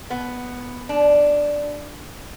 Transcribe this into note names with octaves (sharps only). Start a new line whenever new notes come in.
B3
D4